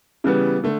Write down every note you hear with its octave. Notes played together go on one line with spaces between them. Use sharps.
C#3 E3 G3 B3
D3 A3